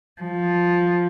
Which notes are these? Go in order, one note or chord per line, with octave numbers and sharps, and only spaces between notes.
F3